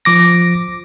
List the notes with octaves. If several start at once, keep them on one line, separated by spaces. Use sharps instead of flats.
F3 D6 A#6